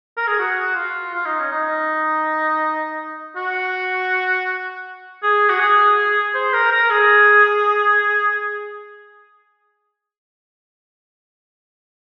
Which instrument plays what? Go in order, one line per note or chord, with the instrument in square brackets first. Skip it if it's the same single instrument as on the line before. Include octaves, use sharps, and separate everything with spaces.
[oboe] A#4
G#4
F#4
F4
F4
D#4
C#4
D#4
F#4
G#4
F#4
G#4
C5
A#4
A#4
G#4